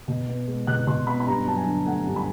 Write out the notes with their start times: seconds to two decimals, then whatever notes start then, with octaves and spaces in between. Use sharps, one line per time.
0.08 B2
0.28 B3
0.47 G#3
0.67 B2 F#6
0.87 B2 C6
1.07 B3 B5
1.20 B5
1.27 G2 A#5
1.47 F#3 A5
1.57 G#5
1.67 D3
1.86 A3 F#5
2.07 G2
2.16 B5